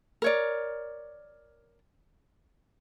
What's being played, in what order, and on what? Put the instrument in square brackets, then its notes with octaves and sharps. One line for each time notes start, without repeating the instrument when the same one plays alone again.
[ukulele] A#4 C#5 D5